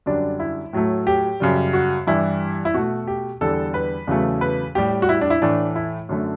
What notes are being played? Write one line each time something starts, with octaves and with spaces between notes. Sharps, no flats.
F#2 D3 G3 D4
E4
A2 F#3 A3
G4
F#2 C#3 G3
F#4
G2 E3 G3 E4
E4
B2 A3 F#4
G4
E2 D3 G3 A4
B4
E2 C#3 F#3 A3
B4
A2 G3 G4
F#4
E4
D4
E4
A2 E3 A3 D4
E4
F#2 D3 A3